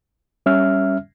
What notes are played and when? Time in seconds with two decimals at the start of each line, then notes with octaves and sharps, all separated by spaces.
0.46 G3 C#4 E5 F6